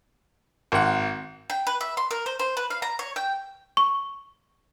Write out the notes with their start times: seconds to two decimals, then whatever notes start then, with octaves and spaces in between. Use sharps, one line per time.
0.72 G#1 A#4 F#5
1.50 G5
1.67 B4
1.81 E5
1.97 C6
2.11 A#4
2.26 C5
2.39 C5
2.57 B4
2.70 F5
2.82 A#5
2.99 C#5
3.16 G5
3.77 C#6